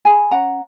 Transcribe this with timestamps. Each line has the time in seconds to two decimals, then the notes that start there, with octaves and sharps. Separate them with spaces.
0.05 G#4 G#5 B5
0.31 C#4 F#5 A#5